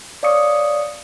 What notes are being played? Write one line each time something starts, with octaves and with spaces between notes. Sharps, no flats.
C#5 D5 F5 C#6 D#6 C#7